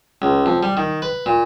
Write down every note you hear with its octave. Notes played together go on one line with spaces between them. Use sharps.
C#2
F2
G3
D#3
B4
A#2